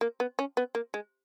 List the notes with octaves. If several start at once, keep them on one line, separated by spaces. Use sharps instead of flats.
A#3
B3
C#4
B3
A#3
G#3